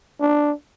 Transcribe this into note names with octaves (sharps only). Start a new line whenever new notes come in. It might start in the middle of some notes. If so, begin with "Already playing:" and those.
D4